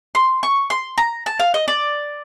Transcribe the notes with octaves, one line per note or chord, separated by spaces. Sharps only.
C6
C#6
C6
A#5
A5
F5
D#5
D5